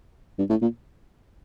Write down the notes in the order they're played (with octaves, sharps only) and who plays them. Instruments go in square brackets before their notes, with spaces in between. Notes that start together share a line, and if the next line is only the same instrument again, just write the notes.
[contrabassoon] G2
A2
A#2